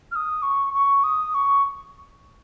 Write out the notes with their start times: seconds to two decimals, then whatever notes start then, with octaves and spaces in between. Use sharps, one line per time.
0.11 F6
0.16 D#6
0.42 C#6
0.73 C#6
1.04 D#6
1.34 C#6